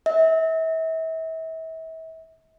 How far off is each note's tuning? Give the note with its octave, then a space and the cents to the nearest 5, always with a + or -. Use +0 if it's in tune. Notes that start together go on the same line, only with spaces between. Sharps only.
E5 -35